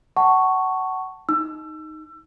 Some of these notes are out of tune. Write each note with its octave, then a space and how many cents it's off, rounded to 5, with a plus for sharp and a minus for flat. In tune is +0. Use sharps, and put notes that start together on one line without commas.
F#5 +25 A5 +10 C#6 +0
D#4 +0 E6 +30